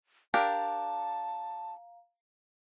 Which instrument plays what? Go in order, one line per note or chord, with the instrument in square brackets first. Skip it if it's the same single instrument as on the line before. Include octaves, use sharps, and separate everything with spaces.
[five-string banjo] D4 G4 A#4 [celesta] F5 A#5 [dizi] A5